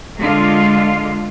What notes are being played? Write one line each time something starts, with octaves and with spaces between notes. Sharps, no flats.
D3 G#3 F4